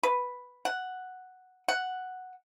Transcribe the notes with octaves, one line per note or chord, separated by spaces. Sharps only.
B4
F#5
F#5